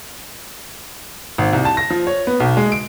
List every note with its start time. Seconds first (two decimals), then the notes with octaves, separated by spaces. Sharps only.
1.38 G#1
1.53 C2
1.65 A5
1.77 A#6
1.90 F3
2.07 C#5
2.27 B3
2.40 B1
2.57 G#3
2.72 D7